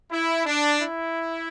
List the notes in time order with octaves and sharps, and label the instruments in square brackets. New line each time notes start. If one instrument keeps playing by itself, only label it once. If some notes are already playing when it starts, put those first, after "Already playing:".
[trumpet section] E4
D4
E4